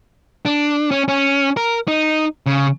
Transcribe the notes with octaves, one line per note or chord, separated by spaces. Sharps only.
D4
C#4
C#4
A#4
D#4
C#3